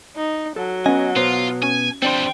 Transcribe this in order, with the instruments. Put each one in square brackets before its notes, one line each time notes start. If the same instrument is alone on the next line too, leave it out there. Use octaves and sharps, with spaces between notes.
[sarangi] D#4
[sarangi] F#3 [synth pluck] A4
[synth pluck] B3 C#4 [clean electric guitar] D#5 G#5
[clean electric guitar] B2 B3 [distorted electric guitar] F4 [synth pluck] C5
[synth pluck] C#4 [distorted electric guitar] G#5
[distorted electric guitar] F3 G3 [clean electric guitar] C4 D4 C5 [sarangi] G5